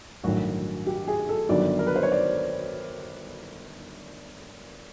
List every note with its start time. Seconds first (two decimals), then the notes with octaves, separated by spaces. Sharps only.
0.24 A1 G2 D#3 F#3 F#4
0.86 G4
1.08 G#4
1.29 A4
1.49 G1 G2 D#3 F#3 D5
1.79 A#4
1.87 B4
1.96 C5
2.03 C#5
2.12 D5